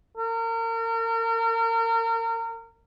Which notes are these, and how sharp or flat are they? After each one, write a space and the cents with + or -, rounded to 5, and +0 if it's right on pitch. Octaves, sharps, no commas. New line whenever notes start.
A#4 -35